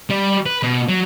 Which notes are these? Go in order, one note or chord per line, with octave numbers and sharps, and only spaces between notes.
G3
B4
B2
F#3